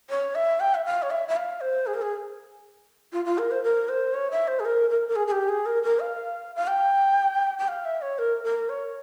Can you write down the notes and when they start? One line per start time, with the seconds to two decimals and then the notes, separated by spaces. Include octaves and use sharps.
0.10 C#5
0.35 E5
0.60 G5
0.75 E5
0.85 F5
1.02 C#5
1.10 E5
1.28 E5
1.36 F5
1.61 C5
1.87 G#4
1.94 A#4
2.02 G#4
3.13 F4
3.25 F4
3.38 A#4
3.51 C5
3.63 A#4
3.89 C5
4.14 C#5
4.31 E5
4.48 C5
4.60 G#4
4.65 A#4
4.90 A#4
5.08 A#4
5.16 G#4
5.27 G#4
5.32 G4
5.49 G#4
5.66 A#4
5.83 A#4
6.00 F5
6.55 F5
6.67 G5
7.59 G5
7.68 F5
7.85 E5
8.02 C#5
8.18 A#4
8.44 A#4
8.69 C#5